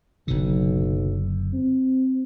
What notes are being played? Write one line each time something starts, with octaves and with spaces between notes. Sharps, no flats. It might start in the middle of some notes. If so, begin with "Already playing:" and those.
F#1 B1 D3
C4